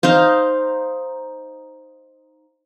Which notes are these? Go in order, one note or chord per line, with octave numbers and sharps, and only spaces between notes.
D#4 C5 F5